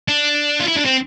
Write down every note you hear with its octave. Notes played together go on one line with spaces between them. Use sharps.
D4
F4
E4
D4
C4